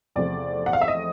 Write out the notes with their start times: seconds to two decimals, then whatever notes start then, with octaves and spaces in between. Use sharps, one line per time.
0.16 E2 C3 F3 A3 D5
0.66 F#5
0.73 F5
0.81 E5
0.88 D#5